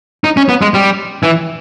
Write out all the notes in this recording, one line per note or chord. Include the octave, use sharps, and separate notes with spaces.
D#4
C#4
B3
G#3
G3
E3